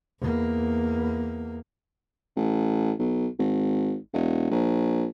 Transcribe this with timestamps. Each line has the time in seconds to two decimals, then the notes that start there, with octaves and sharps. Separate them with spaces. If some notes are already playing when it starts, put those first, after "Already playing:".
0.19 E2 A#3
2.37 A1
2.99 B1
3.39 G#1
4.14 E1
4.51 A#1